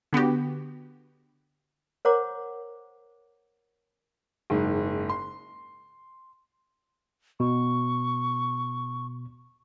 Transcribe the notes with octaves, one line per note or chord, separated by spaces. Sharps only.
D3 B3 F#4 G4
A#4 C5 C#5 F#5 A#5 D6
F#1 G#2
C6
B2 C#6